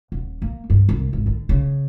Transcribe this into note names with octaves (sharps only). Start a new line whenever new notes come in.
D#1
A#3
G2
C2
G#1
D3
C#3